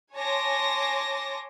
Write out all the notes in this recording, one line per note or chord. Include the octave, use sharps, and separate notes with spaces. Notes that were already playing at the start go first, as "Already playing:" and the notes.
C#5 G#5 A5 C6 D6 A#6